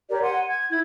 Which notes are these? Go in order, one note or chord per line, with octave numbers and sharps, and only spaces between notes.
G4 A#4 C#5 D5
F#5 G#5 C6
G#6
E4 G#6